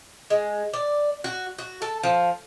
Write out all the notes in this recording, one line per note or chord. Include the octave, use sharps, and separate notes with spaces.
G#3
D5
F#4
F#4
A4
F3